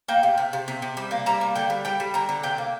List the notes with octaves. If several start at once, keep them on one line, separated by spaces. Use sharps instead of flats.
A#3 G5
C3
C3
C3
C3
C3
G3
A#3
G3 A#5
A#3
D3 G5
G3
G3 G5
G3
D3 A#5
D3
C3 G5
A#3